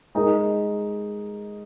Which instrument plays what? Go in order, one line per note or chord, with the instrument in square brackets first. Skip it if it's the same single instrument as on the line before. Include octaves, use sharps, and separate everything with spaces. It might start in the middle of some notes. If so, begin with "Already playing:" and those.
[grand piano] G#3 D#4 A#4 D#5